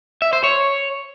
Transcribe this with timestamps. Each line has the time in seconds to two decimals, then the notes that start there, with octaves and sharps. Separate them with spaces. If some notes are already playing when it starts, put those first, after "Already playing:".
0.22 E5
0.33 C5
0.44 C#5